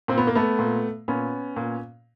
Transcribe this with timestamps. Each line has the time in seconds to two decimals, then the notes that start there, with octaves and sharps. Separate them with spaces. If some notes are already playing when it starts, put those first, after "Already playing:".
0.08 A#2 C4
0.18 B3
0.27 A#3
0.35 A3 B3
0.59 A#2
1.08 A#2 B3 C#4
1.56 A#2